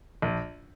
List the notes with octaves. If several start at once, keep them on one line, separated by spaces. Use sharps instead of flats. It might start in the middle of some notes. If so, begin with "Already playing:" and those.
A#1